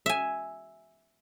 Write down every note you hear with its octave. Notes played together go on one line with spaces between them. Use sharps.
E5 G#5